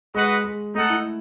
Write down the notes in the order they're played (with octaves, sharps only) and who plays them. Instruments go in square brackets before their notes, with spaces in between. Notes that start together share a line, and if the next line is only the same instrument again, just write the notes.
[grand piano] G#3 [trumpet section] F#4 B4 D#5 F#5
[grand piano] G#3
[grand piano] A3 [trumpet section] D#4 A4 D#5 F#5
[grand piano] E4